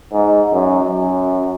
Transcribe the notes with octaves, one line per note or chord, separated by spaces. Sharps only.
G#2
F#2
F#2